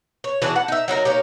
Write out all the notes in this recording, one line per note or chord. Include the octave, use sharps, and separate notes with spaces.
C#5
E3 D4 F#4 G#4
F#5 A5
D#4 E5
F#3 D#4 E4 A#4
A#3 C#4 D#4 G4